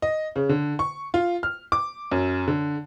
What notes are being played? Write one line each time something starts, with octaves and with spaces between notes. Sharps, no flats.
D#5
C#3
D3
C#6
F4
F6
D6
F#2
D3